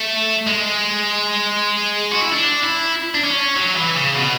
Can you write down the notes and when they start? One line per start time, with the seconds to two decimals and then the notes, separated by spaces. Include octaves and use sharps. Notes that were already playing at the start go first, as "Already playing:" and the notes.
Already playing: A3
0.47 G#3
2.12 F#4
2.22 E4
2.32 D4
2.64 E4
3.15 D4
3.25 C#4
3.56 F#3
3.76 E3
3.96 C#3
4.17 B2